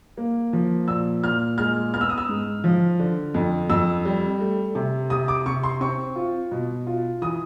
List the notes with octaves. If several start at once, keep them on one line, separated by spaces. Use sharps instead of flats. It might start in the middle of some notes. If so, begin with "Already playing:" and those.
A#3
F3
A#2 E6
A#2 F6
G#3 F6
B3 F6
E6
D#6
E6
G#2
F3
D3
F2
F2 E6
G3
A3
C3
C3 D#6
D6
C3 C#6
C6
C4 C#6
F4
B2
F4
E3 D#6